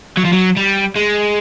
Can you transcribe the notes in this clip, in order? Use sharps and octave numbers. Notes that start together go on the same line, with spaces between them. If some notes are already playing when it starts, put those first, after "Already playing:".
F#3
F3
F#3
G3
G#3